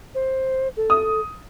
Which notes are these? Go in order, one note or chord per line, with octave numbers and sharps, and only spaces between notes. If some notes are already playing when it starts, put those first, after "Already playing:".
C5
A4
D#6